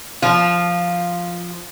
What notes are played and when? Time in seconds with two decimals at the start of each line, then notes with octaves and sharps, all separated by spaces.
0.22 F3 F4